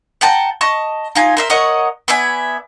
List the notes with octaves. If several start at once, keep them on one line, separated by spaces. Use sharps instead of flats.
F#5 G5 A5 A#5
D#5 A5 C#6
D#4 F4 G#5
A#4 C5 E5
A#4 C#5 D#5 F#5
B3 D5 E5 G#5